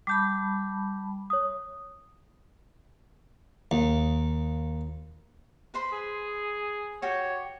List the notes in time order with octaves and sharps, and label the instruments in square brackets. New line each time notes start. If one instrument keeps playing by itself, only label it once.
[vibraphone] G3 A5 B5 [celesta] D6 G6
[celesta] C#5 D#6
[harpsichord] D#2
[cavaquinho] B4 C5 C6
[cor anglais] G#4
[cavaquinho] F#4 G4 [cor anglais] C#5